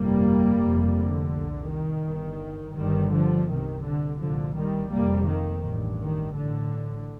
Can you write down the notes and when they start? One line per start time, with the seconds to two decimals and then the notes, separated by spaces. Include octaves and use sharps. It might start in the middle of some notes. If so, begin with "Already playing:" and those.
Already playing: G1 F2 C3 G3 A#3
0.61 F1 F2 C3
0.96 D3
1.32 C2 A#2
1.68 D#3
2.05 G1 G2
2.76 G1 G2 D#3 G3
3.12 D3 F3
3.48 C2 C3 D#3
3.84 D3
4.20 C2 A#2 D3 F3
4.55 D#3 G3
4.91 F1 F2 C3 G3 A#3
5.27 D#3
5.63 A1 G2
5.99 D#3
6.35 A1 A2 D3